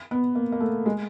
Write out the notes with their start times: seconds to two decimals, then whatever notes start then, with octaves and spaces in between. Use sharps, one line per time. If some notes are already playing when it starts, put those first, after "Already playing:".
0.11 B3
0.35 A#3
0.52 A#3
0.60 A3
0.86 G#3